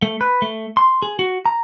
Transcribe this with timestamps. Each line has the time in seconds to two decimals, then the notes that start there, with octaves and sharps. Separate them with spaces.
0.02 A3
0.21 B4
0.42 A3
0.77 C6
1.02 G#4
1.19 F#4
1.46 A#5